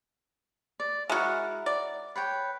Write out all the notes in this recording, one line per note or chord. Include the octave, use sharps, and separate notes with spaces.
D5
G#3 E4 F#4 A#4 F#5
D5
B4 C#5 G5